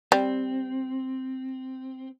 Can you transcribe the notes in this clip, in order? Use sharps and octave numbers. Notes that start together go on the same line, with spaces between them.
G3 C4